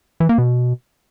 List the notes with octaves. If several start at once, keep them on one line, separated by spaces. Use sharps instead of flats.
E3
A#3
B2